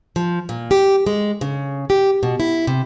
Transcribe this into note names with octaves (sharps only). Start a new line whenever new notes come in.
F3
A#2
G4
G#3
C#3
G4
B2
E4
C3